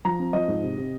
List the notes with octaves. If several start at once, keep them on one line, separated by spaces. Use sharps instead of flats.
F3 A#5
C4
F3 D#5
G#2
C3
C3